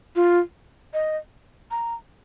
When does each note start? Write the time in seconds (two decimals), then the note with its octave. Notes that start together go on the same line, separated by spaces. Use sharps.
0.16 F4
0.94 D#5
1.71 A#5